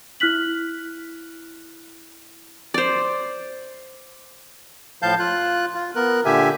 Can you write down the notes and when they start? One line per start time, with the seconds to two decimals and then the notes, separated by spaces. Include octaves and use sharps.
0.20 E4 F6 F#6 B6 F#7
2.74 C5 D5
5.02 A2 F3 F5 A5 G6
5.19 F4 F#6
5.75 F4
5.95 B3 A#4 F#6
6.25 A#2 D3 G4 E5 G#5